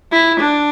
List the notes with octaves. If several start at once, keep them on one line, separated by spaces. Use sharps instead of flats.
E4
D4